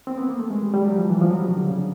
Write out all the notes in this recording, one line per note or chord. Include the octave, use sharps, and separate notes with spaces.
C4
B3
A#3
A3
G#3
G3
G3
F#3
F3
E3
F3
F#3
G3
C#3
D3
C#3